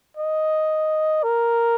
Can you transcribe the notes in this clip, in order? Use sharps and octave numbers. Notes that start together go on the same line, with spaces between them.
D#5
A#4